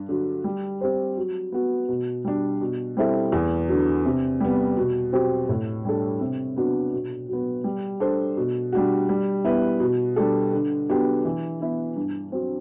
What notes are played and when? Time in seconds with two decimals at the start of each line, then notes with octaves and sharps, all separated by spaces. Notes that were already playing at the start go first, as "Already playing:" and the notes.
Already playing: G2
0.09 D3 F#3
0.44 G3
0.81 C4 G4 C5
1.17 F#3
1.52 B3 F#4
1.89 B2
2.25 G3 D4
2.61 B2
2.97 G3 C4 E4 A4
3.32 E2
3.69 D3 F#3
4.05 C3
4.41 G3 B3
4.77 B2
5.12 F#3 C4 G4
5.49 A2
5.85 G3 D4 A4
6.21 C3
6.56 F#3 B3 D4 F#4
6.93 B2
7.29 F#3 B3
7.64 G3
8.00 D4 A4 C5
8.37 B2
8.73 G3 D4 F#4
9.09 G3
9.44 B3 E4 B4
9.80 B2
10.16 G3 D4 A4
10.53 D3
10.89 F#3 B3 D4 G4
11.25 E3
11.61 B3 E4
11.96 G2
12.32 F#3 C4